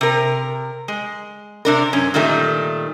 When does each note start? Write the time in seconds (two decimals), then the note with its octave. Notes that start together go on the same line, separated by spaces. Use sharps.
0.01 C3 A#4
0.88 G#3
1.65 C3 D4 A#4
1.93 F#2 C#4
2.14 A#2 D#3 G3 A3